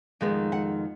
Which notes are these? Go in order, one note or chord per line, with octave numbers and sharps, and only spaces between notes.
F2 D#3 G#3 B3
F#5